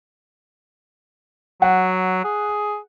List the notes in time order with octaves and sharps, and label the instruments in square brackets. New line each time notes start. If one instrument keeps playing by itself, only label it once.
[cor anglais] F#3 [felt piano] F#5
[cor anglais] G#4